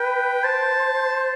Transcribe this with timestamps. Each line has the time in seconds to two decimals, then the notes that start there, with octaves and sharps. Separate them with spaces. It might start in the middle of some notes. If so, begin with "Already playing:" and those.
Already playing: B4 G5
0.44 C5 A5